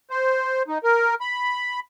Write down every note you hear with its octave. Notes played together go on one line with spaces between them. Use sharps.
C5
D#4
A#4
B5